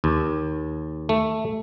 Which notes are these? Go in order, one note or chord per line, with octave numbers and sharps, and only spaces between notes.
D#2
A3